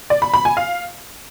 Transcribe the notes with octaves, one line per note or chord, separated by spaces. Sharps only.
D5
B5
B5
G#5
F5